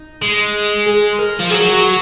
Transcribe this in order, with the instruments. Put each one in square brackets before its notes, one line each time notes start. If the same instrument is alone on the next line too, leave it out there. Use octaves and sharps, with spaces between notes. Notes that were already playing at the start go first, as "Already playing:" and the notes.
Already playing: [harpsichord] D#4
[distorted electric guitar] G#3
[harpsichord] G#4
A#4
[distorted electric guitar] F3
[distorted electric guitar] F#3 [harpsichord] G#4
[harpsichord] F#4